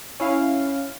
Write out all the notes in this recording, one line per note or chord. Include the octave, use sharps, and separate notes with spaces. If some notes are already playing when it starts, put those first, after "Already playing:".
C#4 E4 F5